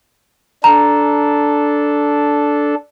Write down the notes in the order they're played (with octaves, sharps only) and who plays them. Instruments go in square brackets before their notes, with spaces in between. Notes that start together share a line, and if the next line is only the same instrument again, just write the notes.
[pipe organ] D4 A4 [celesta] A#5